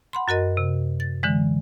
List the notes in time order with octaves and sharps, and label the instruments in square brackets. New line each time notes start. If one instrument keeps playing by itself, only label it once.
[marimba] F#5 B5 C6
F#2 F#4 A#4 D#5
C3
A6
D3 E3 G#3